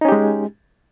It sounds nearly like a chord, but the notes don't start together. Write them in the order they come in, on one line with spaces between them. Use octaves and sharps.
D#4 C#4 G4 G#3